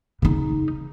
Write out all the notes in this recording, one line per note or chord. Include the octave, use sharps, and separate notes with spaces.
C#3 D#4